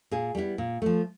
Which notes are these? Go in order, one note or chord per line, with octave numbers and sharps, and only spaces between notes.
A#2 G#4
G3 B3 E4
A#2
F3 A3